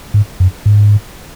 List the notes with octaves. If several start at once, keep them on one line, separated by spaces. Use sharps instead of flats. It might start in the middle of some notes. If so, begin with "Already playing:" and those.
G#2
F#2
G#2